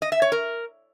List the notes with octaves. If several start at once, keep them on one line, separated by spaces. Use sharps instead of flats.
D#5
E5
C#5
A#4